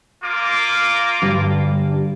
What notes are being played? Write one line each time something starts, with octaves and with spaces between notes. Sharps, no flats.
A#3 F4 D6
G2 D3 G3